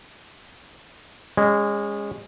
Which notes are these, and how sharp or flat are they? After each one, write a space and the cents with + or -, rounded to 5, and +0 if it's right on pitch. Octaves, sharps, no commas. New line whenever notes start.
G#3 -20 C#4 +0